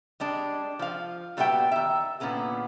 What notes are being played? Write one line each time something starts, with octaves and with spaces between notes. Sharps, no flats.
G3 G#3 D4
F3 F5
A#2 G3 B3 F#4 E5 G5
D#3 E5
A#2 D3 B3 C#4 G#4